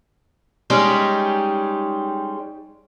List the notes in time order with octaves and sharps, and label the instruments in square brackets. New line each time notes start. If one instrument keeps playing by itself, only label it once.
[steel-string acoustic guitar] G3 G#3 C#4 D#4 G4 G#4